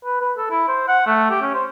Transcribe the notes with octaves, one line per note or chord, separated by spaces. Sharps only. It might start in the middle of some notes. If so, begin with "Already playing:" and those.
B4
B4
A4
E4
C5
F#5
A3
G4
C#4
C5